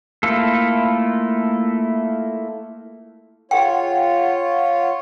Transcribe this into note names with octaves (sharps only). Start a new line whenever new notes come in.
A3 A#3 E4 F4 A4
F4 G#4 C#5 F#5 G5